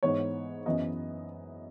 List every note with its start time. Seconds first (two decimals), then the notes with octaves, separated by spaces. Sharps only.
0.03 G#2 E3 B3 C#5
0.66 F#2 E3 B3 D#5